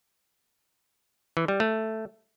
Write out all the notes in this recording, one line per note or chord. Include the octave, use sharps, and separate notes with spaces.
E3
G3
A3